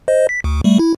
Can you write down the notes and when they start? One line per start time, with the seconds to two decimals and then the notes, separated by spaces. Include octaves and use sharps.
0.08 C5 D#5
0.29 B6
0.44 D2
0.64 G3 A3
0.79 E4